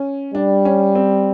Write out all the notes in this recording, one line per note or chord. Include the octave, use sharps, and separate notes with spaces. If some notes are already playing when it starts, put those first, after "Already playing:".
Already playing: C#4
G3 D4
C#4
C4